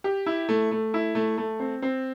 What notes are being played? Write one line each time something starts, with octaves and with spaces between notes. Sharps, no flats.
G4
E4
A3
A3
E4
A3
A3
C4
C4